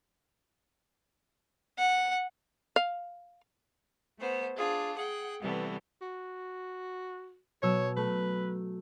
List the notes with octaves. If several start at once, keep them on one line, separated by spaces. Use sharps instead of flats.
F#5
F5
A3 B3 C5
D4 F4 G#4
G#4 F#5 G5
C3 E3 G3 A3 B3
F#4
B2 F#3 C#5 E6
A3 B4